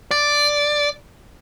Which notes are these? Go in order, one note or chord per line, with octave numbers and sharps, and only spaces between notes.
D5